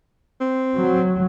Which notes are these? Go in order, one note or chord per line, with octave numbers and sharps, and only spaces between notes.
C4
F#3